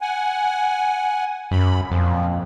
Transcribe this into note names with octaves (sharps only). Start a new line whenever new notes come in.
F#5 G#5
F#2 B5
F2 A#2 F3